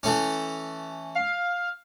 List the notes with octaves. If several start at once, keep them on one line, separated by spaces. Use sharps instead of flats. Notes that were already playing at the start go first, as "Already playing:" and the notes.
E3 A3 C#4
F5